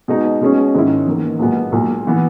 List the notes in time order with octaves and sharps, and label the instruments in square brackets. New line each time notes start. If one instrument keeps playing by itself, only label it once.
[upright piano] B2 G#3 D#4
B2 G#3 C#4 G#4
G#2 D#3 G#3 C#4 E4
E2 D#3 A#3
B1 A#2 G#3 B3
B1 A#2 G#3
E3 B3